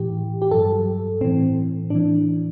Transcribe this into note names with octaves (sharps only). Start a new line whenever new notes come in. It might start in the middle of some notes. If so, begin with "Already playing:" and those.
Already playing: A2 E3 G4
G4
G2 F#3 A4
A2 E3 C4
A2 E3 D4